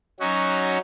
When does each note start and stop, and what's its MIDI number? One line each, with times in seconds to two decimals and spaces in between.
0.20 0.78 54
0.20 0.78 61
0.20 0.78 63
0.20 0.78 66